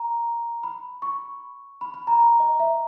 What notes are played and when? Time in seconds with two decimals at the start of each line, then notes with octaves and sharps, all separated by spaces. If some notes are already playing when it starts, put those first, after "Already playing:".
Already playing: A#5
0.63 B5
1.02 C#6
1.81 B5
1.94 B5
2.07 A#5
2.20 A#5
2.40 D#5
2.60 E5